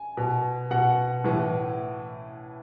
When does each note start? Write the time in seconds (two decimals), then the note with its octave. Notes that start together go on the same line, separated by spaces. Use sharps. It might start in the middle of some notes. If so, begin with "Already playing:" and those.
Already playing: G#5
0.17 B2
0.71 B2 F#5
1.24 A2 E3